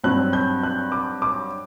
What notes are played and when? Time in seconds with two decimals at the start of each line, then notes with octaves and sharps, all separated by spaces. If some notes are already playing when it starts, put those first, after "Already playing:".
0.04 G2 F#3 C4 F#6
0.33 G6
0.63 F#6
0.92 D6
1.22 D6